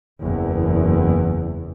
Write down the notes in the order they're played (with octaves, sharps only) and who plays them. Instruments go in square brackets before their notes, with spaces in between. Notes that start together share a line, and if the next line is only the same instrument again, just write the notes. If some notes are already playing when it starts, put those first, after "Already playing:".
[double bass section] F#1 E2